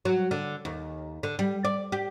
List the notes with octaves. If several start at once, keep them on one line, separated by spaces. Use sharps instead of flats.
F#3
D3
D#2
D3
G3
D5
G4